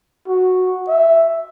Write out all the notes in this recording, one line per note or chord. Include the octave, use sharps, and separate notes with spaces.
F#4
E5